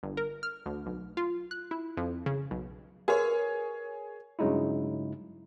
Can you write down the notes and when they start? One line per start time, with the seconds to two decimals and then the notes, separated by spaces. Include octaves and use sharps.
0.03 G1
0.17 A#4
0.43 F6
0.66 D2
0.86 B1
1.17 F4
1.51 F#6
1.71 E4
1.97 F2
2.26 C#3
2.51 B1
3.08 F#4 G#4 A#4 B4 C#5
4.39 G2 C#3 F#3 G#3 D#4 E4